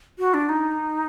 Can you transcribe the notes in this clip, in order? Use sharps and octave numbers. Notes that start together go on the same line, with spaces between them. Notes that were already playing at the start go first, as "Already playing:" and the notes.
F#4
D4
D#4